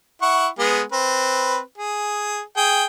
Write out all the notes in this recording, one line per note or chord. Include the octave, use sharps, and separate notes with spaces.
E4 F#5 C#6
G#3 B3 G#4
C4 B4
G#4
G#4 G5